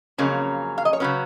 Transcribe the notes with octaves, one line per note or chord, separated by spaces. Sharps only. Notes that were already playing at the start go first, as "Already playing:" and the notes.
F2 C#3 F#3 A#3 C#4
F5
D#5
C#5
C#3 F#3 C#4 B4